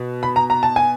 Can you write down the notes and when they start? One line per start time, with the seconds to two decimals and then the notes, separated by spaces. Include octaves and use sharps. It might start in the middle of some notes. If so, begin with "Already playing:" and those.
Already playing: B2
0.23 B5
0.36 A#5
0.50 A#5
0.63 A5
0.76 G#5